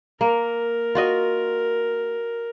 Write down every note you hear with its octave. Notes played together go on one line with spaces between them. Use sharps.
A#3 A#4
F4 F#4 D#5